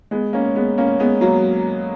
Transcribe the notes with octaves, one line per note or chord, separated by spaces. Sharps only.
G#3 B3
A#3 C#4
G#3 B3
A#3 C#4
G#3 B3
F#3 A#3